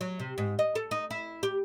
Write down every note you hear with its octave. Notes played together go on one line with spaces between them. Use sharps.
F#3
C3
G#2
D#5
A4
D#4
E4
G4